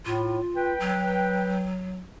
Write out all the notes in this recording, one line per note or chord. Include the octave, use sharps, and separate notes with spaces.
A2 F4
B4 G5
F#3